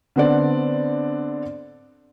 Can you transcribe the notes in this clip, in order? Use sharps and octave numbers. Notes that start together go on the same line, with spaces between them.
D3 B3 C4 D4 D5